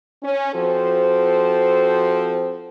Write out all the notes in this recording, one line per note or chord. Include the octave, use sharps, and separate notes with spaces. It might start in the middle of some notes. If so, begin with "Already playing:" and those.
C#4
F3 C4 F#4 A4 C5